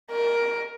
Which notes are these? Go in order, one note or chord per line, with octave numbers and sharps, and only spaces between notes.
A#4